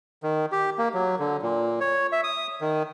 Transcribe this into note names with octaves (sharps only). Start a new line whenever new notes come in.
D#3
G4
A#3
F#3
D3
A#2
C#5
E5
D#6
D#3